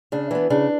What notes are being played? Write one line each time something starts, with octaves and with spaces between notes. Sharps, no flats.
C#3 D4
E3 B3
C#3 D4